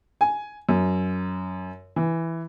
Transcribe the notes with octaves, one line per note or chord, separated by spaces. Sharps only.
G#5
F#2
E3